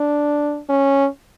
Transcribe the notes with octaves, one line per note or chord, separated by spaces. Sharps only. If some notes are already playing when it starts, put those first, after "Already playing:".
Already playing: D4
C#4